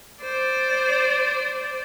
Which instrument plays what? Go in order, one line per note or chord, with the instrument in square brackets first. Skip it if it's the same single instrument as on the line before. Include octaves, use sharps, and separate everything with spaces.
[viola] C5 D5